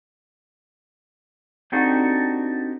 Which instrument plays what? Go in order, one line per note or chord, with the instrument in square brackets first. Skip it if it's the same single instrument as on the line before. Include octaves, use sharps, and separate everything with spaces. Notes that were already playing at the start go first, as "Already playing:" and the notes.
[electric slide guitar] C4 D4 D#4 F#4 G4 A4